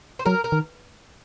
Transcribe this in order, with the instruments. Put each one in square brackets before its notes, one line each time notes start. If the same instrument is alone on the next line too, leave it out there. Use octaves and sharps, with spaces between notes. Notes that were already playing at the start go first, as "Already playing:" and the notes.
[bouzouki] C5
[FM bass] F#3 [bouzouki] A#4
[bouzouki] A#4
[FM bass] D#3